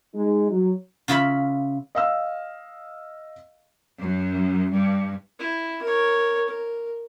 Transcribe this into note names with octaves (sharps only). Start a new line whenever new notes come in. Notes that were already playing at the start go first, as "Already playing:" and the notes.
G#3 D#4
F#3
C#3 F4 E5 B5
D#5 F5 E6
F#2
G2
E4
A#4 C#5
A#4